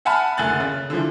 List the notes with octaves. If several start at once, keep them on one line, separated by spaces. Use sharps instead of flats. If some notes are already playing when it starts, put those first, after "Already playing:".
E5 F#5 G#5 A5 B5 F6
F#1 D2 G#5 F#6 A6 F#7
C#3
D3 E3 F3